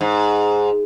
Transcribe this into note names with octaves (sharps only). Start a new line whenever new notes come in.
G#2